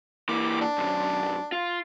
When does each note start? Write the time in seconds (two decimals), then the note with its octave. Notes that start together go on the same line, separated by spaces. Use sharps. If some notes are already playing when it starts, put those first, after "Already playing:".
0.29 E3 A#3 D6
0.61 D4
0.78 B1 F#2
1.52 F4